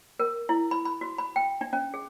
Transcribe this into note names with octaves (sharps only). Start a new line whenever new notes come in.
A#4
E4
B5
B5
F#4
B5
G5
D4
C#4
G#4